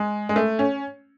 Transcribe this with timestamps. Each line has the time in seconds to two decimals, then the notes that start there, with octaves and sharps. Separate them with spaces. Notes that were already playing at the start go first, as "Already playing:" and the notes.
Already playing: G#3
0.29 G#3
0.36 A3
0.59 C#4